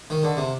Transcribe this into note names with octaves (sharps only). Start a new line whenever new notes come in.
D#3
D3
C3